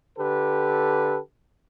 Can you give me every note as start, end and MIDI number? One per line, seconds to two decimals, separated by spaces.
0.19 1.18 50
0.19 1.18 67
0.19 1.18 69
0.19 1.18 71